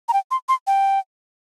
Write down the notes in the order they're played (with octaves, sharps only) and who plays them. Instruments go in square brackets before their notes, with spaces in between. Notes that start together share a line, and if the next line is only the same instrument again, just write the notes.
[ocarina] A#5
G5
C6
C6
G5